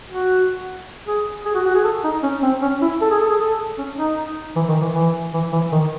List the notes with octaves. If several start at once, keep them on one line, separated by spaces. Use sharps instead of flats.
F#4
G#4
G#4
F#4
F#4
G#4
A4
D#4
C#4
C4
C#4
E4
A4
G#4
A4
G#4
A4
C#4
D#4
E3
D#3
E3
E3
E3
E3
D#3